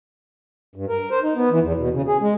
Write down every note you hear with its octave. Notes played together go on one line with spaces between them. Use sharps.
G2
A#4
C5
D#4
B3
E3
E2
B2
C#3
G#4
G#3